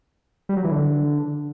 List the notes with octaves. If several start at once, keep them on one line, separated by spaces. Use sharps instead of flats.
G3
F#3
E3
D3